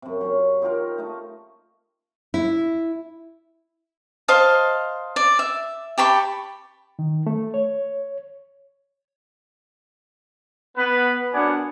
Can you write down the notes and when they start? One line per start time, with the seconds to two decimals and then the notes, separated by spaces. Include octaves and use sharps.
0.02 F#2 C3
0.21 F#3 C#4 C#5
0.62 D#4 F4 G4 A#4
0.98 A3 D#4
2.34 E4
4.28 C5 D#5 F5 A5
5.16 D5
5.39 E5
5.98 G4 A5 B5 C#6
6.99 D#3
7.27 A3
7.54 C#5
10.77 B3 B4
11.34 F#2 B3 D4 D5 F#5 G#5